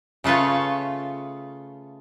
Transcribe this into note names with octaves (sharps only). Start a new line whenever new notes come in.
C#3 A3 F4 B4 C#5